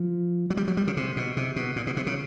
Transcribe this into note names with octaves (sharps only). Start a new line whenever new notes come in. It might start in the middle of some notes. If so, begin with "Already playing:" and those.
Already playing: F3
F#3
G3
F#3
G3
C#3
C3
B2
C3
B2
A#2
B2
C3
C#3